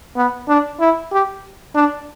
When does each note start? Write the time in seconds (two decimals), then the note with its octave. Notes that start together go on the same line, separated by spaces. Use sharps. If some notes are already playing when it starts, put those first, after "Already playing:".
0.17 B3
0.49 D4
0.80 E4
1.12 G4
1.75 D4